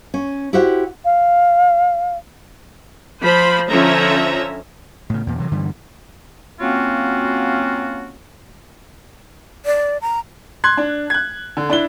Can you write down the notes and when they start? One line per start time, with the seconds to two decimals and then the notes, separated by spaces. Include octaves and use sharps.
0.14 C#4
0.53 E4 F#4 G4 C5 F#5
1.05 F5
3.22 F3 C5 B5
3.70 D3 F3 C#4 E5 A#5
5.10 A2 C#3
5.27 E2 A#2
5.38 C3 E3 F#3
5.51 G2 D3 E3 G3
6.60 F#3 A#3 C4 C#4 F4 F#4
9.66 D5
10.02 A#5
10.64 C6 F#6 G#6
10.77 D4
11.10 F#6 G#6
11.57 D3
11.70 D4 E4 G7